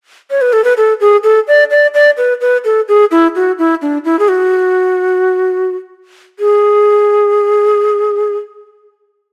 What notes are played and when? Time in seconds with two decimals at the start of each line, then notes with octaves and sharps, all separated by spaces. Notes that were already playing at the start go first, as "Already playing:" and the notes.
0.31 C#5
0.41 B4
0.53 A4
0.64 B4
0.77 A4
1.01 G#4
1.24 A4
1.48 D5
1.71 D5
1.94 D5
2.17 B4
2.41 B4
2.65 A4
2.88 G#4
3.11 E4
3.35 F#4
3.59 E4
3.82 D4
4.05 E4
4.19 G#4
4.28 F#4
6.39 G#4